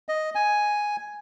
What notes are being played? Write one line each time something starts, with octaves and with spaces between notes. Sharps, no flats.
D#5
G#5